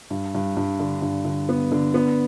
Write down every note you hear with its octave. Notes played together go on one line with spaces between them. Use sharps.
G2
G2
G2
D3
G2
D3
B3
D3
B3